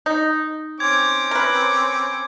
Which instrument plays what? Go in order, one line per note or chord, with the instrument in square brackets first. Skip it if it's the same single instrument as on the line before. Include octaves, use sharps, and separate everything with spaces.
[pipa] D#4
[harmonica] C4 C#4 D6 [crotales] G#6
[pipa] A#4 B4